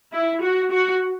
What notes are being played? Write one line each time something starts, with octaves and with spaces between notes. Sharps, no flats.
E4
F#4
F#4